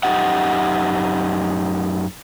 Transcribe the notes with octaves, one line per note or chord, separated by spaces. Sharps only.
F#2 A3 D#4 G4 D#5 F#5